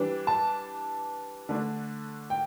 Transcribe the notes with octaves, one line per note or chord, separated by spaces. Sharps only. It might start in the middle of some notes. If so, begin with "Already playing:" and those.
Already playing: E3 G3 D4
A5
D3 A3 D4
G5